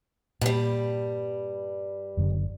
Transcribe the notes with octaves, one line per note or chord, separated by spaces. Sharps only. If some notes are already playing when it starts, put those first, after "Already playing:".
G2 A#2 G3
F#1 F#2 D3